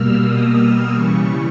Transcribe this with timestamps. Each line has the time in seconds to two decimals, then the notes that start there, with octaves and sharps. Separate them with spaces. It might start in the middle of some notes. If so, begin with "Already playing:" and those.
Already playing: B2 G3 A#3 E6 F6
0.24 D#6
0.58 D#6
0.92 C#3 E3 G3 C#6